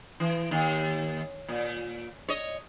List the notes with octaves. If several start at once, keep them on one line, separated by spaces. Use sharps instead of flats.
E3
D#2
A#2
C#5 D#5